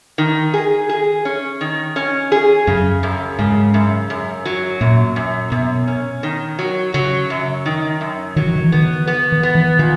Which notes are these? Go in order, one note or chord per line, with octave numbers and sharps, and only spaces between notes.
D#3
G#4
G#4
C#4
D#3
C#4
G#4
F#2 C#3
F#2
G#2 C#3
F#2
F#2
F#3
F#2 A#2
F#2
F#2 B2
C#4
D#3
F#3
C#3 F#3
F#2
D#3
F#2
D#3 F#3
E3
D#3
E3
D#3 B3
B3
D#3
B3
E3
A#2 D#3